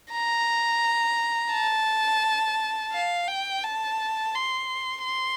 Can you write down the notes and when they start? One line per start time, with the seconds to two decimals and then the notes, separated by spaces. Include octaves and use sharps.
0.12 A#5
1.52 A5
2.93 F5
3.28 G5
3.64 A5
4.34 C6
5.05 C6